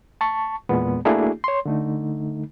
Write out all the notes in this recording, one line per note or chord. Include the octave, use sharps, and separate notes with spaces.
A5 C#6
E2 A#2 G#3 B3
A3 A#3 D4 E4 F#4 G#4
C#5 C6
D3 A3 D#4